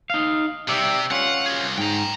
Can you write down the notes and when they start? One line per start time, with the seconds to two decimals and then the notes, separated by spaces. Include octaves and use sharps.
0.10 D#4 F5
0.68 C3 G4 D5 E5
1.11 C#4 F4 F#5
1.46 F#4 G#4
1.59 C2
1.78 G#2 G5 A#5